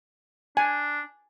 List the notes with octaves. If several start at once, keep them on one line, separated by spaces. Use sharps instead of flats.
D4 G#5